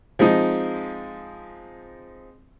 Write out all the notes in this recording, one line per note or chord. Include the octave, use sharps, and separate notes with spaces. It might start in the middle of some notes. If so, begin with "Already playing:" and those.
F3 G#3 C4 D#4